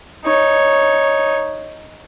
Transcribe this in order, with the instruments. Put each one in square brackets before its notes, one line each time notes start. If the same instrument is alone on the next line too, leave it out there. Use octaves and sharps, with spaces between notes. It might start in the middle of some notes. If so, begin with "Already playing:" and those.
[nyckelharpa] D#4 C#5